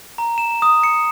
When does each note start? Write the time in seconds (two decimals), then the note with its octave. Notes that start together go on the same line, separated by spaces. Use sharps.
0.18 A#5
0.38 E7
0.62 D#6
0.83 C#7